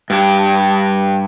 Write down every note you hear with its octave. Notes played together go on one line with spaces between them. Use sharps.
G2 G4